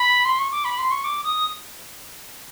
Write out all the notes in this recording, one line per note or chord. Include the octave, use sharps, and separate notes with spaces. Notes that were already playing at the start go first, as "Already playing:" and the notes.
Already playing: B5
C6
C#6
D6
B5
C6
C#6
D6
D#6